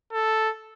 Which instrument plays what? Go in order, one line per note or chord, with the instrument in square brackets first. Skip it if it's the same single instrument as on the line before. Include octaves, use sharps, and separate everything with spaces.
[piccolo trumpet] A4